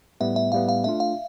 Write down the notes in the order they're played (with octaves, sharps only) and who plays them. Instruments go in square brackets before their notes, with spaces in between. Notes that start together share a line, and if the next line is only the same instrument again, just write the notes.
[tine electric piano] A2 G3 B3 [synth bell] E5
[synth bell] E5
[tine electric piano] A2 G3 B3 [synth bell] F5
[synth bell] F5
[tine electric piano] A3 D4 F4 [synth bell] E5
[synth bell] F5